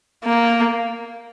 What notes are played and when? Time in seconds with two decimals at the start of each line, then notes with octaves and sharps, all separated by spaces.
0.25 A#3